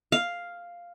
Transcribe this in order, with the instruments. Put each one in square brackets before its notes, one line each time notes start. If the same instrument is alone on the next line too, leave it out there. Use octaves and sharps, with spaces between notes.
[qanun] F5